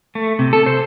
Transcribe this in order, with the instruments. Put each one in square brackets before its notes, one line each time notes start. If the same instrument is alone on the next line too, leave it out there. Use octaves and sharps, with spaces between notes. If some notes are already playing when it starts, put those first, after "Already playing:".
[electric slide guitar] A3
C3
A4
C5